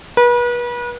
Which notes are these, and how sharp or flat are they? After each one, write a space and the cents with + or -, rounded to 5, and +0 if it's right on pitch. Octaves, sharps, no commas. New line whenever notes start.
B4 -35